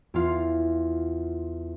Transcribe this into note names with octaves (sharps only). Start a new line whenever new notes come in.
E2 F4